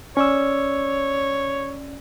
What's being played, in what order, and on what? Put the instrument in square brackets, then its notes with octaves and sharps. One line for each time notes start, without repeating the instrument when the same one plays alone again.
[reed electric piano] C#4 D5 E6 [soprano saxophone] C#5